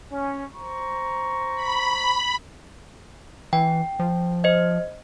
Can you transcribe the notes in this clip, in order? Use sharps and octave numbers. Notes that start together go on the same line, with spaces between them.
C#4
C5 A#5 C#6
B5
E3 G5
F3
C5 D#5